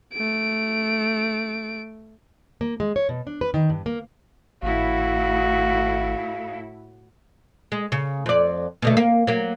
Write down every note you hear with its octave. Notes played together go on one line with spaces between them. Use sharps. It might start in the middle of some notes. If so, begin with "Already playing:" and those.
A3 D7
A#3
G#3
C#5
B2
D4
B4
D#3
G2
A#3
G#1 A2 E4 F#4 A4 F5
G#3
C#3
F2 D5
B2 D3 A3
A#3
F#3 A#3